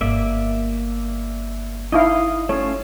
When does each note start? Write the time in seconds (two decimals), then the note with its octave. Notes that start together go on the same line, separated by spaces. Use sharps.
0.01 G1 A#3 D5 E5
1.92 D#4 E4 D#5 F5
2.49 A3 C#4 F4 C#5